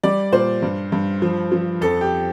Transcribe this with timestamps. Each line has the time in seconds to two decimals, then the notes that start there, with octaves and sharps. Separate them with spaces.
0.03 G3 D5
0.32 A#2 C5
0.62 G2
0.92 G2
1.22 F3
1.52 F3
1.81 F2 A4
2.01 G4